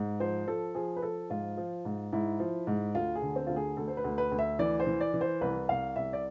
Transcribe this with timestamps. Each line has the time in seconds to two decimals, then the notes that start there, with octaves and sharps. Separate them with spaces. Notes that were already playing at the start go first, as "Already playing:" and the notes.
Already playing: G#2
0.20 F3 C5
0.47 F3 A4
0.75 F3 G#4
0.97 B4
1.02 F3 A4
1.30 G#2 F4
1.57 F3
1.85 G#2
2.13 G#2 E4
2.40 F3
2.67 G#2
2.95 D2 F4
3.15 G#4
3.22 D3
3.36 C4
3.47 D2 F4
3.56 G#4
3.77 D2 A4
3.88 C5
3.97 B4
4.04 D2
4.18 B4
4.32 D2
4.39 E5
4.59 E3 D5
4.80 C5
4.86 E3
5.01 D5
5.14 E3
5.21 C5
5.41 C2 B4
5.69 C2 F5
5.96 C2 E5
6.13 D5